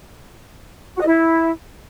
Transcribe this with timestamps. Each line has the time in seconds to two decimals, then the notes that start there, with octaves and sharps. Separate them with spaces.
0.95 F#4
1.01 D#5
1.06 E4